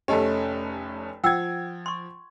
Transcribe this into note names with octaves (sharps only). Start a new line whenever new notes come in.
F1 A3 C#4 G4 D#5 A5
F3 F#5 G5 E6 G#6
C6 C#6